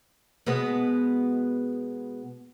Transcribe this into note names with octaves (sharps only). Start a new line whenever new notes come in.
B2 G#3 B3